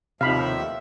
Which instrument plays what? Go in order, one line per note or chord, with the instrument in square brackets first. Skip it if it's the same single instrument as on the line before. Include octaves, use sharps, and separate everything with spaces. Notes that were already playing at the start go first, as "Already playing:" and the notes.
[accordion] D#2 A2 F3 [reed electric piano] C3 D#4 [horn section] E5 [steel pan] F5 B5